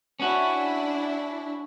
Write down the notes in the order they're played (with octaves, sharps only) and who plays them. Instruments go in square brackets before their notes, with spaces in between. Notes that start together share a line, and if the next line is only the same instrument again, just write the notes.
[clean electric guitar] C#4 F#4 [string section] D4 E4